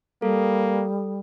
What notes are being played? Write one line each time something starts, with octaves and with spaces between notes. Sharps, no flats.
G3 A#3 A4